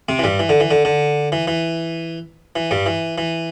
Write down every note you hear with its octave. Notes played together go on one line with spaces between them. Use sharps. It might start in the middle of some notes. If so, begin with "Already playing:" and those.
C3 C4
E3
G2 G3
E3
D3
E3
D3
D3
E3
E3
E3
G2 G3
E3
E3